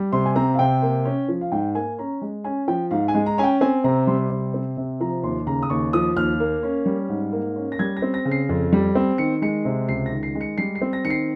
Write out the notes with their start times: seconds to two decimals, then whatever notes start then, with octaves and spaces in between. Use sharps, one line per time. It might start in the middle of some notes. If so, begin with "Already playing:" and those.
Already playing: G3
0.12 C3 C6
0.26 G#5
0.36 C4 A#5
0.54 F5
0.59 C3 G5
0.82 A#3
1.05 C#4
1.29 F3
1.41 F5
1.52 G#2 G5
1.75 A#3 G#5
1.98 C#4 A#5
2.22 G#3
2.44 C#4 G#5
2.68 F3 G5
2.91 G#2 F5
3.08 G#5
3.15 G#3
3.26 A#5
3.38 C#4 G#5
3.43 G5
3.61 C4 G#5
3.84 C3 A#5
4.07 G3 C6
4.30 C3
4.54 C4
4.77 C3
5.01 F3 A#5
5.23 D#2 C6
5.47 C#3 A#5
5.63 D#6
5.70 D#2 C#6
5.93 F3 D#6
6.16 D#2 F6
6.40 A#3
6.63 C#4
6.86 G3
7.09 G#2
7.32 A#3
7.56 C#4
7.72 A#6
7.79 G3 G#6
7.97 A#6
8.02 C4
8.14 A#6
8.25 C#3
8.31 C7
8.49 F2
8.73 G3
8.95 C4
9.18 D#3 C#7
9.42 G#3 C#7
9.65 C3
9.89 C#2 C7
10.06 A#6
10.12 D#3
10.23 C7
10.35 G#3
10.41 C#7
10.58 G3 C7
10.75 C7
10.81 C4
10.93 A#6
11.04 D#3 C#7
11.10 C7